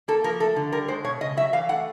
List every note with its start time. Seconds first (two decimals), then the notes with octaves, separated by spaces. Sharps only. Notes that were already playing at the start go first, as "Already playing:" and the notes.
0.08 A#3 A4
0.24 F3 A#4
0.40 A3 A4
0.56 D3
0.72 G3 A#4
0.88 G#3 C5
1.04 B2 C#5
1.21 C#3 D#5
1.37 F#3 E5
1.53 E3 F5
1.69 A3 F#5